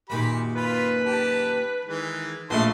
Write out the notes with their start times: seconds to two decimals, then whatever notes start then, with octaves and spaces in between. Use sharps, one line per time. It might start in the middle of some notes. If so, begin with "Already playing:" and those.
0.10 F#2 A#2 D#3 G4 B5
0.55 F4 B4 B5
1.04 G4 A5
1.85 D#3 E3 G#3
2.50 A#1 A#2 F3 A3 A5 C6